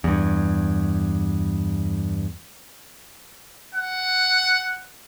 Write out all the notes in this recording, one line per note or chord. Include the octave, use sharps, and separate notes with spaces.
E2 G2
F#5